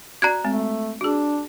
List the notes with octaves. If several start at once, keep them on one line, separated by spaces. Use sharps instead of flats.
F#4 D5 A#5 F#6 G#6
G#3 A3 C4
D4 F#4 G#4